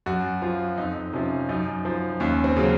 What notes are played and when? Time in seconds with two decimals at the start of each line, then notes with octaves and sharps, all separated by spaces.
0.06 F#2 F#4
0.42 F3 F4
0.78 F2 D#4
1.13 C3 F3 C#4
1.49 F#2 D#4
1.85 F3
2.20 D#2 C#4
2.44 C4
2.57 C#3 F#3